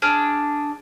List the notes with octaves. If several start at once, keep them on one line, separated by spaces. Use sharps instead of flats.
D4 G#4 F6